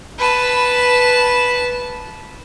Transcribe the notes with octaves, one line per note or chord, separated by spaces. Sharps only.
B4 A5